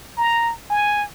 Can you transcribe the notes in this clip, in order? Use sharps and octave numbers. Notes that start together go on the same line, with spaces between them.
A#5
G#5